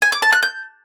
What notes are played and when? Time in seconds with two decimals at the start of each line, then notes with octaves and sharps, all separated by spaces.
0.02 G#5
0.12 D6
0.22 A5
0.32 F#6
0.43 G6